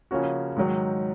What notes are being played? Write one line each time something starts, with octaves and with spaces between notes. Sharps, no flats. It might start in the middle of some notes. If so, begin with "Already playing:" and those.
C#3 F3 A#3 C#4 F#4
G#2 D#3 F#3